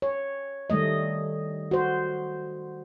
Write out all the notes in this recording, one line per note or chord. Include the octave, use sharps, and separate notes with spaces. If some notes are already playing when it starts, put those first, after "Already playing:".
C#5
D#3 G3 A3 D#5
F#4 C5